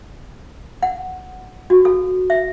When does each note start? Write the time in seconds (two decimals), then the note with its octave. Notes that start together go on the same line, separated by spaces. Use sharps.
0.83 F#5
1.70 F#4
1.85 A4
2.30 E5